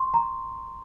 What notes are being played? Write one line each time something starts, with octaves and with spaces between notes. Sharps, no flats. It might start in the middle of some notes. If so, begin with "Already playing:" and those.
Already playing: C6 C#6
A#5